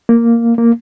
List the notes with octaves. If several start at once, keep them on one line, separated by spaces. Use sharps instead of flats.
A#3
A#3